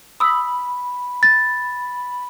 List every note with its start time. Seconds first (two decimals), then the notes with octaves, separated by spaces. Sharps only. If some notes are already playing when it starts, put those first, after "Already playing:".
0.20 B5 D#6 E6
1.23 A6